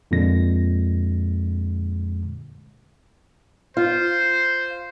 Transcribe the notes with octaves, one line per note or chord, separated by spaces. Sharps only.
F2 A#2 D3 G#3 A#6
F4 C5